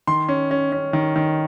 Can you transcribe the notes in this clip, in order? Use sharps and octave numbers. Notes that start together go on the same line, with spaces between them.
D#3 C6
C#4
C#4
C#4
D#3
D#3